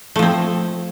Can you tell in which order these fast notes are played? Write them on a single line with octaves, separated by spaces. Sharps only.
A3 F3 C4